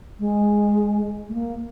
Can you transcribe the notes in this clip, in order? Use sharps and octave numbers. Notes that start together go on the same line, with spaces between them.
G#3
A3
A#3